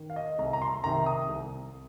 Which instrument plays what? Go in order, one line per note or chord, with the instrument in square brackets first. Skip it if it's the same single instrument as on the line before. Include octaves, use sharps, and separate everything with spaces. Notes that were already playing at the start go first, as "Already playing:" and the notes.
Already playing: [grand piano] D#3
F5
D#5
C2 A#5
A#5
C6
C3 D#3 A#5
D#6
C2